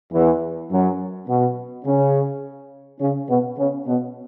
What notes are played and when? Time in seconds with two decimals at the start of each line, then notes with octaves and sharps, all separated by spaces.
0.13 E2 E3
0.71 F#2 F#3
1.28 B2 B3
1.86 C#3 C#4
3.00 C#3 C#4
3.29 B2 B3
3.58 C#3 C#4
3.87 B2 B3